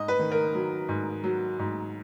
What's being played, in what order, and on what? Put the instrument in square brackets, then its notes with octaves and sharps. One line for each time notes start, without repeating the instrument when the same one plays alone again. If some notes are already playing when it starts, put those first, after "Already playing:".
Already playing: [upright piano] G#2 D#5
B4
D#3
A#4
F#3
G#2
F#3
G#2